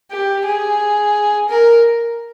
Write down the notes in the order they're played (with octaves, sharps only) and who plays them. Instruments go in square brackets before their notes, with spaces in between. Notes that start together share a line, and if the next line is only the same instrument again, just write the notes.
[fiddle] G4
G#4
A#4